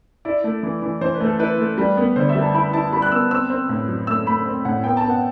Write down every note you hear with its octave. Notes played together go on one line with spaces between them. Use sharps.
E4 D5
A3
E3
E3
E3 C5
B4
A3
A4
E4 B4
A3
G3
B3
D3 C5
E5
G3
A5
E4 B5
E4 A5
G3 B5
F#6
B3 E6
C4 E6
C4
A2
F#3
A3 E6
A3 B5
C4
A2 F#5
B3 G5
A5
B3
F#5